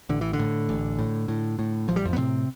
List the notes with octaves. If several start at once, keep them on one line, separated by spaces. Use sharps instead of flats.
A1 D3
E3
D3
A2
A1
A2
A2
A2
A1 F3
G3
F2 F3
B3
A2 C3 C4